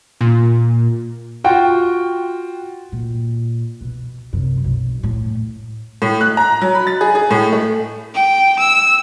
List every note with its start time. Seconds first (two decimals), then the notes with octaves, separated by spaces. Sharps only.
0.21 A#2
1.44 F4 F#4 G5
2.92 A#2
3.81 B2
4.33 F#2 C3
4.64 B1
5.03 A2
6.02 A2
6.21 F#6
6.37 A#5
6.62 F#3
6.75 B5
6.87 A6
7.01 G#4
7.15 G#4
7.31 A2
7.53 A3
8.15 G5
8.59 E6